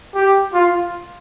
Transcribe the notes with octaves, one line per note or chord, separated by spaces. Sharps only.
G4
F4